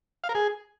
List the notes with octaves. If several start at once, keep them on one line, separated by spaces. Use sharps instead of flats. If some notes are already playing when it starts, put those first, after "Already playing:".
F5
A#4
G#4